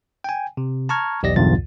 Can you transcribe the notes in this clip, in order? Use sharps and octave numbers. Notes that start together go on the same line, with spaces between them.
G5 G#5
C3
A5 A#5 C#6 F6 G#6
B1 E2 G4 D5 D#5 A#6
B1 E2 G2 D3 F4 A6